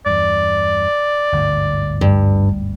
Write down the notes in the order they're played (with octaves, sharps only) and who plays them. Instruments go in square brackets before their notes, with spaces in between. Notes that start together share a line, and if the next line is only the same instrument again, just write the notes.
[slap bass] E2 G2 [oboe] D5
[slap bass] G1 D2 G#2
[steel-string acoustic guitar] G2